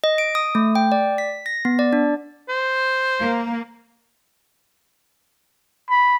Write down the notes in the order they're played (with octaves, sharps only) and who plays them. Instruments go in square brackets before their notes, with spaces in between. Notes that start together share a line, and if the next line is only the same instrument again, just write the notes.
[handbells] D#5
D7
D#6
A3
G5
D5
B6
A#6
B3
D5
D4
[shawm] C5
[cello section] A#3
[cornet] B5